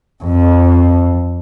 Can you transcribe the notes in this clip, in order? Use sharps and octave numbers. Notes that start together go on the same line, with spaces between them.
F2